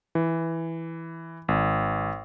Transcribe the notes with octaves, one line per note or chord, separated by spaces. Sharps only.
E3
G#1